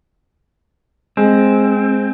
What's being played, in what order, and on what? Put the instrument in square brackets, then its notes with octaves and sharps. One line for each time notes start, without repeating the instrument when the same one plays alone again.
[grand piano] G#3 [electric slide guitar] C4